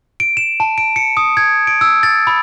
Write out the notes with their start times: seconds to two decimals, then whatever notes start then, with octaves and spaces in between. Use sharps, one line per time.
0.20 D7
0.37 E7
0.60 A5
0.78 D7
0.96 C#7
1.17 D#6
1.37 G#6
1.67 D7
1.81 E6
2.03 A6
2.27 B5